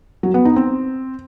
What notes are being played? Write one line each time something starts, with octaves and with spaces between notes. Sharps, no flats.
F#3
B3
D#4
C4